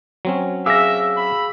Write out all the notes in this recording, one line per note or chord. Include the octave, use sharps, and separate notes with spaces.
F#3 C4 C#4
G#4 E5 F5 D6 E6 A#6
B5